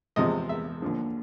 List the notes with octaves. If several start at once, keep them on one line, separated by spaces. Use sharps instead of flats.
E2 C3 F3 G#3 D#5
E5
D#2 D3 F3